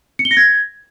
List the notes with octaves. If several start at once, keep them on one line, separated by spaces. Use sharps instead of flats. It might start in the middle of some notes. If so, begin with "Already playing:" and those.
C#7
G7
A#6
G#6